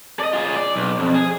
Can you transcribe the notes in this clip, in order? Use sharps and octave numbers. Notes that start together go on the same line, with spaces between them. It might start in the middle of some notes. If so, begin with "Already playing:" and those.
D5 D#5
F4 G#4
D5
B1
F2
G#4